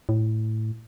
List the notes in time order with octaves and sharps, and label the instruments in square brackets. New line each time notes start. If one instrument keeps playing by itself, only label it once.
[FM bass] A2